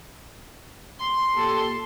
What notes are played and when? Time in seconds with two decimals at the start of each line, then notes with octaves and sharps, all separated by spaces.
1.00 C6
1.36 A#2 G4 A4